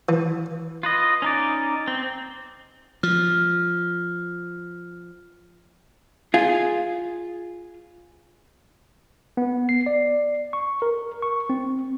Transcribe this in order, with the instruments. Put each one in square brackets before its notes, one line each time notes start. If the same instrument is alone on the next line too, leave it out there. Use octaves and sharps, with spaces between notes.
[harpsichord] E3
[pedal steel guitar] F4 B4 D#5
C#4 D#4 D5
C4
[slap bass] F3 [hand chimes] F6
[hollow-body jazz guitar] F4 G#4
[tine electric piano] B3
C7
D5
C#6
A#4
C#6
C4